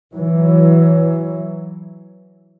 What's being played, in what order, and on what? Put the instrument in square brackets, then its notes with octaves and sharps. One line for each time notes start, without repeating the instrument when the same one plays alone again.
[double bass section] E3 F#3